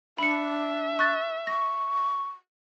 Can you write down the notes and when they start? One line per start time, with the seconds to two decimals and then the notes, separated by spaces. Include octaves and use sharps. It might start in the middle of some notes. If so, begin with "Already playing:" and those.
0.18 D4 E5 B5 C#7
0.99 C#6 F#6 A6
1.47 C#6 A#6